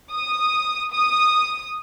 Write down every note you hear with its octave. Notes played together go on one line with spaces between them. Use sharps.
D#6
D#6